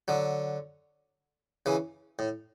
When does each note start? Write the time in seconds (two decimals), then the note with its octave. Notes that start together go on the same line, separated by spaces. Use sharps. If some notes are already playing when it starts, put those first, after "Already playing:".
0.08 D3 F#3
1.66 C#3 E3
2.19 A2